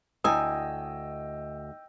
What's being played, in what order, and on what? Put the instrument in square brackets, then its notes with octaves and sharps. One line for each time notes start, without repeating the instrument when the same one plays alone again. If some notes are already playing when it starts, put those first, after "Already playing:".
[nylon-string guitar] D2 G#5 [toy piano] E4 D#6 [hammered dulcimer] D#5 [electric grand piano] G5 E6